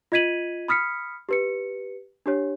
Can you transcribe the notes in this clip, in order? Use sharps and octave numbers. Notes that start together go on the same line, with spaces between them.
F4 D#5 G#6 B6 D#7 F#7
B5 D#6 F6 B6 C#7
G4 B4 C#7
D4 G4 C#5